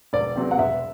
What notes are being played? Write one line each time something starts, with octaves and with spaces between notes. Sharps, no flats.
E1 D5
E2 C3 F#3 C4
F#5
E1 E5